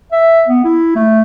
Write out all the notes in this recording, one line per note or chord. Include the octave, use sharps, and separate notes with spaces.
E5
B3
E4
A3